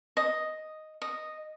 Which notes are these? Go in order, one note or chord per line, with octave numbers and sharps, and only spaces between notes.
D#5
D#5